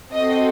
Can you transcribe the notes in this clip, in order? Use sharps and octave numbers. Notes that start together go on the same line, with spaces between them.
C4 F#4 A4 D#5